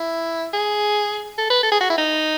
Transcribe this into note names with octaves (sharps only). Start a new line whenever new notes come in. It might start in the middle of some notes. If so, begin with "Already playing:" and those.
Already playing: E4
G#4
A4
B4
A4
G#4
F#4
E4
D#4